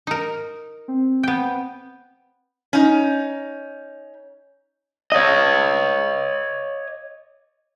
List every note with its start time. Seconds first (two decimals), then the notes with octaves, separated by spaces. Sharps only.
0.07 D#4 A#4
0.88 C4
1.23 B3 G5
2.73 C#4 D#4
5.12 C#5 D#5